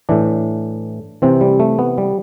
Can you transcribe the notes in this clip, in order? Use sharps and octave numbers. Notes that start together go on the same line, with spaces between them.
A2 E3 D4
C3 E3 C4
G3
A3
B3
G3